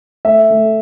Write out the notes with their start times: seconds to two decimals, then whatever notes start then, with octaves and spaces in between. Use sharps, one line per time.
0.25 A3 E5
0.50 A3